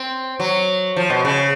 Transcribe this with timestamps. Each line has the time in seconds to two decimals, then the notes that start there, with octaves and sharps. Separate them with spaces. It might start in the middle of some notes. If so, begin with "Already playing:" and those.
Already playing: C4
0.40 F#3
0.96 F3
1.10 B2
1.25 C#3